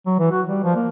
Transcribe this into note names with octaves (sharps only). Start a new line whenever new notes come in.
F#3
E3
F#4
G3
F3
A#3